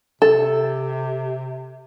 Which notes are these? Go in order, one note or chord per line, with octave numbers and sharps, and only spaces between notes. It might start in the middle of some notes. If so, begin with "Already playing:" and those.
C3 A4